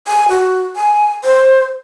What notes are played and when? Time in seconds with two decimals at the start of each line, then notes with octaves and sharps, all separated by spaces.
0.07 G#5
0.29 F#4
0.76 G#5
1.24 C5